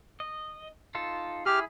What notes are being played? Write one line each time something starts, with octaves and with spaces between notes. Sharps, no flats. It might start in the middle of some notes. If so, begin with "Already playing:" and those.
D#5
D#4 F4 A4
E4 G4 G#4 F6